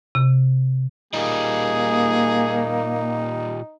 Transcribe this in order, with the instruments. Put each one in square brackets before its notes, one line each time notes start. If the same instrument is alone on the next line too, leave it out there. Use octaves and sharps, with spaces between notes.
[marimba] C3
[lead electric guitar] A#2 G3 [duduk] A#3 [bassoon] D#4 [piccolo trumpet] G#4